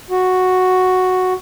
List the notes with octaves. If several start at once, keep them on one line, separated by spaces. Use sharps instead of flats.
F#4